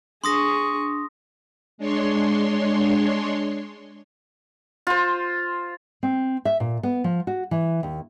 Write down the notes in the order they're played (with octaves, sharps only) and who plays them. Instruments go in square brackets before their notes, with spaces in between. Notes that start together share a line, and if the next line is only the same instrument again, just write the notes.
[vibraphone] D4 [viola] G#4 C#6 [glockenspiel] C6 D#6 A#6
[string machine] G#3 D4 C#5 C6
[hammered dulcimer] F4 C5
[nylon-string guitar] C4
E5
A#2
B3
F3
F#4
E3
D#2